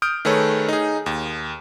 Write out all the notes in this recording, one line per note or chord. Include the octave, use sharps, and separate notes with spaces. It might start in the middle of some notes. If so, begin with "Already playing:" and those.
D#6 F6 G6 D7
D#3 A3 G#4 A4 B4 C#5
D#4 G#4
D#2